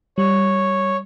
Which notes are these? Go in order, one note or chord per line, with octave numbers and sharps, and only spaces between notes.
G3 C#5